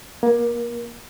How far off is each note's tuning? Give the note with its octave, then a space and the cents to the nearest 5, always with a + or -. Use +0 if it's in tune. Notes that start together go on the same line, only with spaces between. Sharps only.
A#3 +25